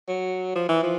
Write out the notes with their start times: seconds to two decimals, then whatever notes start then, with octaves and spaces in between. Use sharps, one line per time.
0.08 F#3
0.55 F3
0.69 E3
0.83 F3